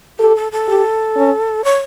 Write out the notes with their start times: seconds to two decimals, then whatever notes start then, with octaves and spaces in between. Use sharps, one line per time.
0.19 G4 A4
0.36 A4
0.52 A4
0.68 G4
1.16 C#4
1.64 C#5